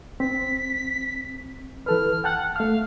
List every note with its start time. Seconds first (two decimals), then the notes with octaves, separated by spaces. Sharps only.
0.20 C4 B6
1.86 E3 A4 B4 F6
2.24 F#5 G5 A5 F#6
2.56 A3 F5 F6